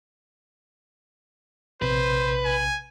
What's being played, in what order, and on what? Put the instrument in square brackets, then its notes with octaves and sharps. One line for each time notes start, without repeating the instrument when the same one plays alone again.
[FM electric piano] A#1 C3 [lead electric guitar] B4 [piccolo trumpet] C5
[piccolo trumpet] G#5